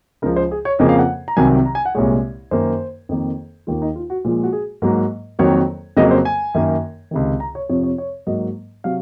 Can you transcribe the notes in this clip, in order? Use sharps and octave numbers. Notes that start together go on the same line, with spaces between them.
C#2 C#3 F3 A#4
C5
G#4
C#5
F2 C#3 F3 A#3 D#5
F5
F#5
A#5
C2 C3 D#3 F#3 G#5
A#5
G#5
F#5
C2 A#2 G#3 C#5
F#2 D#3 A#3 C5
F2 D#3 A#3
D#2 D#3 A#3 F4
D#4
F4
F#4
A#2 F3 G#3 F4
F#4
G#4
G#2 F#3 A#3 A#4
F2 D#3 F#3 A#3 C#5
F2 C#3 F#3 A#3 D#5
C5
G#5
F#2 D#3 A#3
C#2 C3 D#3
A#5
C#5
F2 C3 F3 C#5
C#5
C#5
G#2 F#3 A#3 D#5
C3 F#3 F5